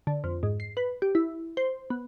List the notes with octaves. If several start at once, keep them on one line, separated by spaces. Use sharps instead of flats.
D3
F2
G#2
C7
B4
G4
E4
C5
B3